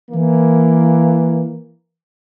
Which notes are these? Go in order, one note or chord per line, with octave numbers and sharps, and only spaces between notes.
E3 A#3